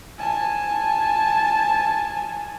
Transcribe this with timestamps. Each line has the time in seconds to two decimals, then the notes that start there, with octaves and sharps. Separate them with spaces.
0.19 G#5 A5